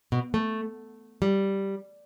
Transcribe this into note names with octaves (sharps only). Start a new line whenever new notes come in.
B2
A3
G3